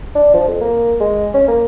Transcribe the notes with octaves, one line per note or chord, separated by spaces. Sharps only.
D4
F3
F2
A#3
G#3
C#4
A#3